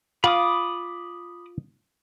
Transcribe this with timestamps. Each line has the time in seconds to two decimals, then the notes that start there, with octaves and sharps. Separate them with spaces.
0.24 F4 B5 D6 D#6